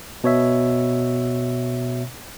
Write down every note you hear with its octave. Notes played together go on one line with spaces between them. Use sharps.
B2 C#5 E5